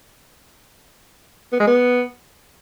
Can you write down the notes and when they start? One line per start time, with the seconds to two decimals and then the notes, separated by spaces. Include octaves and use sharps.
1.52 B3
1.60 G#3
1.67 B3